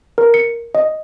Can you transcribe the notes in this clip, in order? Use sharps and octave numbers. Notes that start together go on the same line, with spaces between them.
A#4
C#7
D#5